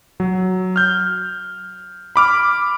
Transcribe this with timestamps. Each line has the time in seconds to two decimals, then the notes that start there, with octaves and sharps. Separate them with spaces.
0.20 F#3
0.76 F6 G6
2.16 B5 D6 F6